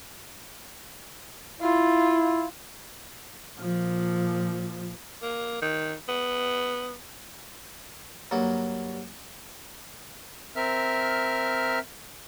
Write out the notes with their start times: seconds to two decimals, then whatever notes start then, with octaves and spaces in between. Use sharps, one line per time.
1.61 E4 F4
3.58 A#2 F3
5.22 A#3
5.62 D#3
6.09 B3
8.31 G2 F#3 A#3
10.56 C4 A#4 E5 F6